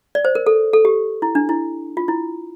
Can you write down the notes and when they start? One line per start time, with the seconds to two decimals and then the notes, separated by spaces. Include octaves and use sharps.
0.15 D5
0.25 C5
0.35 A#4
0.47 A4
0.73 A4
0.85 G4
1.22 E4
1.35 D4
1.49 E4
1.97 F4
2.08 E4